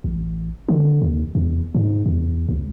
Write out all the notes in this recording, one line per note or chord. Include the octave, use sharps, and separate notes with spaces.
A1
D3
D#2
E2
G#2
E2
C#2